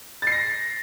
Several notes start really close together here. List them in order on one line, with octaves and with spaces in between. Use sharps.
A6 C7 A#6